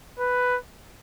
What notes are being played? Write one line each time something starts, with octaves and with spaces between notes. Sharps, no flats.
B4